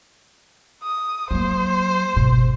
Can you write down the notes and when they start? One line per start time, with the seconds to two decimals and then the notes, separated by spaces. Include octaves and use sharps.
0.83 D#6
1.31 F#3 A#3 C5
2.16 G1 B2